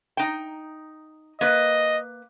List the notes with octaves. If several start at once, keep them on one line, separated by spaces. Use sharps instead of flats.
D#4 G5
A#3 B4 D#5